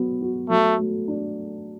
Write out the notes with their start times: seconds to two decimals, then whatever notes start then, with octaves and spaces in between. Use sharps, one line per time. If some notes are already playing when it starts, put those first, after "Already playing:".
Already playing: F#3 B3
0.22 F#4
0.50 F#3 A3
0.79 A3
1.08 D4